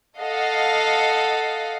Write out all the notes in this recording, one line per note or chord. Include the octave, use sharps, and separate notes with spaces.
A4 D#5 F5 F#5